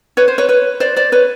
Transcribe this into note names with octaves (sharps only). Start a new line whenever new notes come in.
B4 C#5
C5
B4 C#5
B4 C#5
C5 D5
C5 D5
B4 C#5